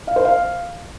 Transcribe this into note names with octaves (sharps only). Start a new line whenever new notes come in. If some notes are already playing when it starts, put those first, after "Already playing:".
F5
C5
F5